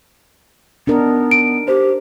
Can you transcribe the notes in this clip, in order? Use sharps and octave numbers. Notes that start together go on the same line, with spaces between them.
B3 D4 D#4 A#4
D7
G4 C5